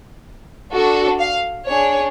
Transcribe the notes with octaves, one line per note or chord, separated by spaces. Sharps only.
D4 F#4 A4
F5
D4 G#4 C#5